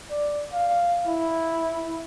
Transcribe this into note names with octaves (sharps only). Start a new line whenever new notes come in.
D5
F5
E4